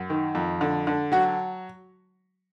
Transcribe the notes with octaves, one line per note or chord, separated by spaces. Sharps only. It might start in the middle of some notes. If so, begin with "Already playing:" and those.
Already playing: F#2
D#3
F2
D3
D3
F#3 F#4